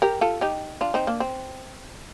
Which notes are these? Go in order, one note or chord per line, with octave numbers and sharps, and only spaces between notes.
G4 A#4
F4 A4
D#4 G4
D4 F4
C4 D#4
A#3 D4
C4